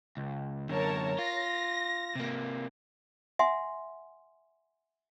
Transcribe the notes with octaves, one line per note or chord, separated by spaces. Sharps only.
C#2
F#2 D3 A#4 C#5 A5
F4 A#6
C3 A#3
E5 F#5 G#5 C6